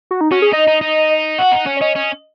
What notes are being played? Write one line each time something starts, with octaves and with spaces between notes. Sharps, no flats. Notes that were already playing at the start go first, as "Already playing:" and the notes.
F#4
D#4
C#4 F#4
G#4
D#4 D#5
D#4
D#4
F#4 F#5
D#4
C#4
C#5
C#4 D#5
C#4